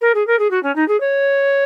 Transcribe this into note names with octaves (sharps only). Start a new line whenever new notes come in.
A#4
G#4
A#4
G#4
F#4
C#4
D#4
G#4
C#5